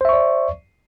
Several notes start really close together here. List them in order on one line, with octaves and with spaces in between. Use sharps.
C5 E5 C#6 D5